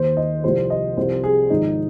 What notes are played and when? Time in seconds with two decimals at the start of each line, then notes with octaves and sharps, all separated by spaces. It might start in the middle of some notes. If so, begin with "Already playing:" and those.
Already playing: D#2 D#3 C5
0.17 D#5
0.43 C2 C3 F3 C5
0.70 D#5
0.97 C2 C3 F3 C5
1.24 G#4
1.50 G#1 G#2 F3 D#4